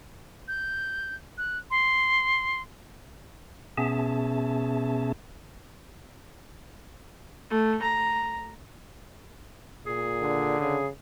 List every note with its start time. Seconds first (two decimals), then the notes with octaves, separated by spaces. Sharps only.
0.48 G6
1.38 F#6
1.71 C6
3.77 B2 B3 C#4 G#4 E5 A5
7.50 A3
7.82 A#5
9.86 A#2 G#4
10.21 D3
10.60 C#3 G#4